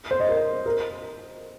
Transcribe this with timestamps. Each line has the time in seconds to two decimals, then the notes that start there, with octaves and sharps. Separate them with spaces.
0.11 C5
0.20 D#5
0.29 A#4
0.66 A#4